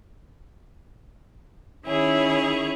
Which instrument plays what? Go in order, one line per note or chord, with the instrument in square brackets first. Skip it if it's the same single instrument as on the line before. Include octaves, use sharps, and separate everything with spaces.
[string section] D#3 C#4 [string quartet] E4 G#4 C#5